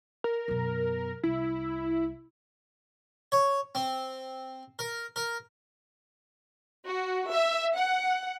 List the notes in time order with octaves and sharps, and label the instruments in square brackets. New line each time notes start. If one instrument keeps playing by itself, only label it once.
[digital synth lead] A#4
[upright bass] F#2 B2
[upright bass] C2 [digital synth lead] E4
[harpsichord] C#5
C4
A#4
A#4
[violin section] F#4
E5
F#5